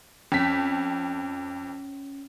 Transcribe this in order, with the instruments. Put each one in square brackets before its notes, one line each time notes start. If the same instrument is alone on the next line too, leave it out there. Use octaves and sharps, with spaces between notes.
[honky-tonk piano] F2 B6 [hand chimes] C#4